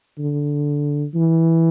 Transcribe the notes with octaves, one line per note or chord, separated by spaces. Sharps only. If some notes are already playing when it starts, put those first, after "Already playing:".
D3
E3